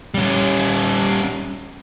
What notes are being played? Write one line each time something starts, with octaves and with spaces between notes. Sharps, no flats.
G3 C#4